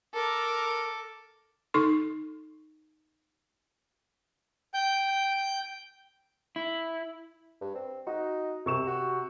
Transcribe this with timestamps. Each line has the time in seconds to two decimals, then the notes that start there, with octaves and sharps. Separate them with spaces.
0.14 A4 A#4 D6
1.74 D#4 A4 C6 C#6
4.74 G5 G6
6.56 E4
7.61 G2
7.75 C4
8.07 D#4 F#4
8.66 C2 C3 C#6 E7
8.87 F#4